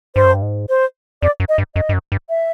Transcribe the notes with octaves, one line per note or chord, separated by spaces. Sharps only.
G2 C5
F#2
G2
G#2
C5
F2 D5
F#2
D#5
G2
F#2 D#5
G2
F#2
G2
E5